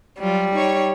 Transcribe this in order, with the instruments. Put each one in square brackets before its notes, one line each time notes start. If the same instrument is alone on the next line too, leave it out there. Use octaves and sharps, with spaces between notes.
[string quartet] F#3 F4 [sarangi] G3
[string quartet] D#4 C#5 C#6